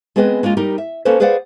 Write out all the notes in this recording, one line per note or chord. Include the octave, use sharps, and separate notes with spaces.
G#3 B3 C4 G#4 B4 D#5
G#3 A#3 C#4 F4
G3 D#4 G4 A#4
E5
A#3 C#4 A4 B4 C5
G#4 B4 C5 D5 F5 F#5